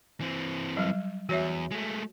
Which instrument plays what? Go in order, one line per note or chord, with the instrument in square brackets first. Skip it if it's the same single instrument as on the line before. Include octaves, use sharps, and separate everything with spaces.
[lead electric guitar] E3 C4
[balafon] F#3 G3
[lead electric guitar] E2 [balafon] F#4 C#5 E5
[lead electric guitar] G#3 A3